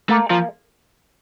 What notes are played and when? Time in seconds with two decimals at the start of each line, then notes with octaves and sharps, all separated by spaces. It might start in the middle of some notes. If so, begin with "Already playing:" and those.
0.09 A3 A#3
0.30 F3 A#3